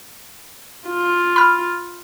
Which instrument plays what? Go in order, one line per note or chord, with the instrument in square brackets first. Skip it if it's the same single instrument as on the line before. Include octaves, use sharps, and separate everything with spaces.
[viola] F4
[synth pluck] B5 F6